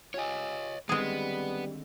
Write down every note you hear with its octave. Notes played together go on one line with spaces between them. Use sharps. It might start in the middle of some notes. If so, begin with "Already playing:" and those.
F4 G4 C#5 D#5 G#5
D3 D#3 G3 G#3 B3 C4 G#4